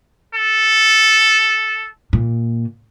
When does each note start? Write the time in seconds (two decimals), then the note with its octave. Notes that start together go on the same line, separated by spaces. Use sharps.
0.35 A4
2.13 A#2